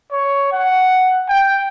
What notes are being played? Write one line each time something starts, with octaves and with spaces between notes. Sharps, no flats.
C#5
F#5
G5